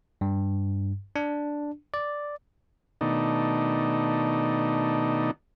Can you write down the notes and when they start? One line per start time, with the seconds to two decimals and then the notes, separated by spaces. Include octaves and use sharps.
0.21 G2
1.16 D4
1.94 D5
3.01 B2 D#3 A3 D4 D#4